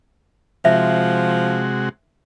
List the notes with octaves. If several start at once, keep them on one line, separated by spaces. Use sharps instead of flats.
C3 F3 G#3 F#4 E5